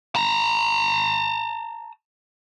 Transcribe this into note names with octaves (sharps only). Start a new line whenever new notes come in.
A5 A#5